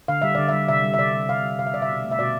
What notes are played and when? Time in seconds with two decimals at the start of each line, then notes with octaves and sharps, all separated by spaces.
0.08 D3 F5
0.22 G3 E5
0.35 D3 D5
0.49 G3 E5
0.69 C3 E5
0.83 G3
0.94 E5
0.98 C3 D5
1.14 G3
1.28 C3 F5
1.43 G3
1.59 C3 F5
1.67 E5
1.74 G3 D5
1.82 E5
1.89 B2
2.04 A3
2.11 E5
2.19 B2 D5